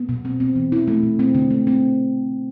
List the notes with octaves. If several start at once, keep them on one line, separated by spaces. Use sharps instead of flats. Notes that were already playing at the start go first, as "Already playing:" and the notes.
Already playing: B3
B2
C4
C4
E3
E4
A3
B2
C4
D3
A3
C4